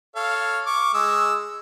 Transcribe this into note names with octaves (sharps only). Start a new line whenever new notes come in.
A4 C#5 F5
C#6 D6
G#3 D#6 E6